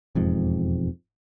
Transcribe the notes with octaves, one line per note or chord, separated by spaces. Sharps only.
E1 F2 G#2